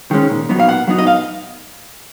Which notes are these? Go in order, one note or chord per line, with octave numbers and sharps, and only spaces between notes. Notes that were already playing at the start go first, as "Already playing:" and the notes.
D#3 G#3 C#4
A#2
F#3 B3 D#4
F5
A#2 F#5
F#3 B3 D#4
D#5
F5